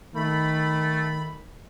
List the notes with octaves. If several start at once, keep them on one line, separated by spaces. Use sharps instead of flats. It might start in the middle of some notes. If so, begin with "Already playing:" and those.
D#3 A3 B5